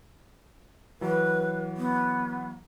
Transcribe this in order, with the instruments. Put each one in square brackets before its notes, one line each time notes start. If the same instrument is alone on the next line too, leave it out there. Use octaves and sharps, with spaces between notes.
[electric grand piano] E3 F#3 [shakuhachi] B4
[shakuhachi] B3